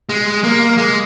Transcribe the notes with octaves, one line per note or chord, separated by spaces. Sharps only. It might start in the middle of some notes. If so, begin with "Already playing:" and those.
G#3
A#3
G#3